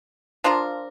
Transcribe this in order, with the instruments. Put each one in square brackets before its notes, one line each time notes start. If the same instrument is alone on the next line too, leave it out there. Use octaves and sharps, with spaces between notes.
[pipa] F3 D4 F4 A#4